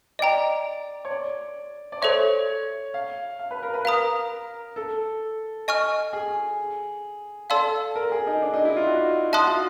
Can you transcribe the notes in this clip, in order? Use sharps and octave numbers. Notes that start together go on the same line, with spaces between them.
D5 D#5 G5 A#5
C#5
D5
D5
A4 C5 C#5 E5
F5
F5
B4
A#4
B4
A#4 F5 A#5 D#6
A4
D#5 G#5 C#6 F6
G#4
A4 D5 F5 A5 C6 E6
A#4
G#4
D#4
D4
D#4
E4
F4
F#4
F4 E5 A5 C6 D#6 F#6
F#4